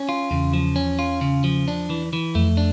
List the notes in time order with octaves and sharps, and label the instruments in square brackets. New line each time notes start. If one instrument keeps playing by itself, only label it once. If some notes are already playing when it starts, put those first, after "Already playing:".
Already playing: [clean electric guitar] C#4
F4
[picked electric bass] E2 [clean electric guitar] C#3
[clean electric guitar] F3
C#4
F4
C#3
F3
D4
E3
E3
[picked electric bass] F2 [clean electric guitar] A3
[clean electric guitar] D4